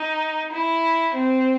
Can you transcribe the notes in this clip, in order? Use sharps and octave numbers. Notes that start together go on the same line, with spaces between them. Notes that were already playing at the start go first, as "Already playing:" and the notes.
Already playing: D#4
E4
C4